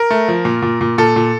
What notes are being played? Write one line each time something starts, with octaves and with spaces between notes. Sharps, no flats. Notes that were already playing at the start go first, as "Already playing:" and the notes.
Already playing: A#4
A3
F3
A#2
A#2
A#2
A#2 A4
A#2